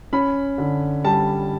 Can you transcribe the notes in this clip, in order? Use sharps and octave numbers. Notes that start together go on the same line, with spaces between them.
C#4 B5
D3
G3 A5